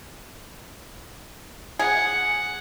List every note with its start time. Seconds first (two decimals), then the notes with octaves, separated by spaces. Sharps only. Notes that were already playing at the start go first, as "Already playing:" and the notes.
1.79 G#4 F#5